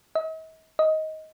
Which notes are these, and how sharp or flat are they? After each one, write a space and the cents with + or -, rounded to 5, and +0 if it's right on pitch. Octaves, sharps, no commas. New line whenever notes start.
D#5 +45
D#5 +15